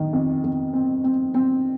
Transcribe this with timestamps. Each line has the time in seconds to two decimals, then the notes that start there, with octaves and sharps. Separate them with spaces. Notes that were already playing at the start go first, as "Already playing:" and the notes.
Already playing: D#3
0.13 F2
0.44 F2
0.73 C4
1.04 C4
1.34 C4